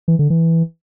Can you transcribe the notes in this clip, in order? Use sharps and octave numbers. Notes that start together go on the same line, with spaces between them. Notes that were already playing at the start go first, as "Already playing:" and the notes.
E3
D3
E3